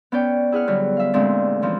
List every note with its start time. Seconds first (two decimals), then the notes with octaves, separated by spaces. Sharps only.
0.12 B3 C#4 D5 G5
0.52 E4 G#4 F#5 F6
0.67 D3 F#3 G3 B3
0.97 E5 F5
1.14 D2 A#2 G#3 C4 D4
1.62 E3 F3 C#4